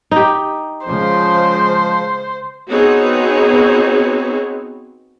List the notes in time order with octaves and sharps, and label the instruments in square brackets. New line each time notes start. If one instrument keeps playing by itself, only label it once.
[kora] D#4 G4
[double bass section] C#3 G#3 [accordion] F3 [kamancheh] C5
[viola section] B3 C4 D#4 F#4 G#4 C#5